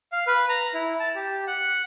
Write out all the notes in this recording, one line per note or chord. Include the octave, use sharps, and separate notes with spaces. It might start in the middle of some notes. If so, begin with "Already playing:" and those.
F5
B4
A#5
E4
A5
G4
F#5